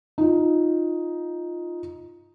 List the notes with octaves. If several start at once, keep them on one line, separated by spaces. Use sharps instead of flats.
D#4 F4